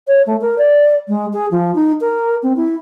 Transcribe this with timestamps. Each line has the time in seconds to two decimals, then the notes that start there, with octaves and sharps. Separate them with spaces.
0.07 C#5
0.26 A3
0.41 A#4
0.58 D5
1.08 G#3
1.33 G#4
1.51 F3
1.75 D#4
2.00 A#4
2.42 C4
2.56 E4